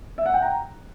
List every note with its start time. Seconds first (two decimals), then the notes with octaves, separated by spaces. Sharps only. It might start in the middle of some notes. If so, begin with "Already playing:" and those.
0.18 E5
0.26 F#5
0.34 G5
0.42 A#5